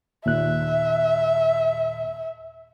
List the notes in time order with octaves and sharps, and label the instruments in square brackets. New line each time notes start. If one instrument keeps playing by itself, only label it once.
[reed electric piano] D#2 A#2 F#6 [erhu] E5